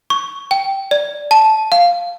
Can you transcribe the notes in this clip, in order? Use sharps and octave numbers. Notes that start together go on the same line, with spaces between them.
C#6
G5
D5
A5
F5